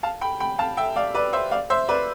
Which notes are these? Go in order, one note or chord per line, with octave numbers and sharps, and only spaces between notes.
F5 A5
G5 B5
G5 B5
F5 A5
E5 G5
D5 F5
B4 D5
C5 E5
D5 F5
C5 E5
B4 D5